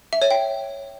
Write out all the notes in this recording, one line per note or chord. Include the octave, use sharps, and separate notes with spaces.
E5
C#5
G5